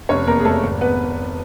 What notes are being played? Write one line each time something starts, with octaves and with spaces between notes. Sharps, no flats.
F1 C#4 C#5
E2 A#3 A#4
G#4
F1 A3 A4
G#1
B3 B4